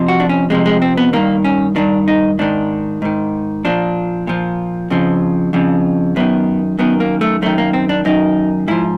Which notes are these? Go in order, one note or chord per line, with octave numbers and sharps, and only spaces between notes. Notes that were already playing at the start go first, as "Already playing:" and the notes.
Already playing: F2 C3 F3
F#4
D4
C#4
F2 C3 F3 G#3
G#3
C4
B3
G2 D#3 A#3
C#4
G2 D#3 D4
D#4
G#2 D#3 D4
G#2 D#3
A#2 F3 D4
A#2 F3
F2 C#3 F3
F2 C#3 F3
F#2 D#3 B3
F#2 D#3 B3
A#3
A3
F#2 D#3 A3
A#3
C4
D4
F#2 D#3 D#4
G#2 F3 E4